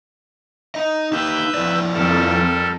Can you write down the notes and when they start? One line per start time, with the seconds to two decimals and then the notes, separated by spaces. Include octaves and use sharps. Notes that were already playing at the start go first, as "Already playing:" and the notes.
0.75 D#4 D#5
1.12 D#4 G4 B4 E5 G6
1.54 F3 E4 D5
1.94 F2 G3 A4 A#4